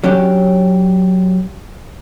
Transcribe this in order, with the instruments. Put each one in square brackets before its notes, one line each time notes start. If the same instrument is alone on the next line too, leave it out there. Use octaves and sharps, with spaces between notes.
[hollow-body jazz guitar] F#3 C#4 D4 G4